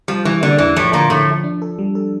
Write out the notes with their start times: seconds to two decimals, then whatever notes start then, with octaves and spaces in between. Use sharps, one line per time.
0.08 F3 G3
0.25 E3 G3
0.42 D3 A#3
0.59 E2 E3
0.76 A2 F3 A3
0.93 A#2 D3 A#3
1.10 A2 D3 A3
1.27 F3
1.44 D4
1.62 A4
1.79 G3
1.95 A4